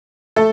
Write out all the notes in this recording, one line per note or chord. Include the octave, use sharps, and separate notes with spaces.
A3 A4